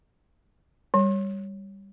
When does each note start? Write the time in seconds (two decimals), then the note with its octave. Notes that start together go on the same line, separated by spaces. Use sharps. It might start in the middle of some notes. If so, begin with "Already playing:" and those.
0.94 G3